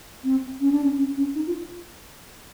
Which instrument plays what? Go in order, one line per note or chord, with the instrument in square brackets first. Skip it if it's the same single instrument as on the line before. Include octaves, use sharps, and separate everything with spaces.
[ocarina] C4
C#4
D4
C#4
C#4
C#4
D#4
F4